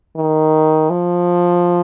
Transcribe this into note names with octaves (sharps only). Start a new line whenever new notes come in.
D#3
F3